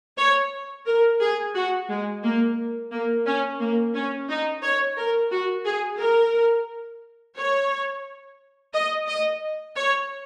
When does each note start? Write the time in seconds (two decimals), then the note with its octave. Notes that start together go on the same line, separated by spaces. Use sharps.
0.17 C#5
0.86 A#4
1.21 G#4
1.54 F#4
1.89 G#3
2.23 A#3
2.91 A#3
3.26 C#4
3.60 A#3
3.94 C#4
4.29 D#4
4.63 C#5
4.97 A#4
5.31 F#4
5.65 G#4
6.00 A#4
7.37 C#5
8.74 D#5
9.08 D#5
9.76 C#5